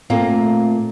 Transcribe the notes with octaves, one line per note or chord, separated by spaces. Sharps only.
A#2 A3 A#3 C4